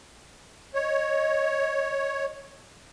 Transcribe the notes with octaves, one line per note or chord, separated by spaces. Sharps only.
C#5 D#5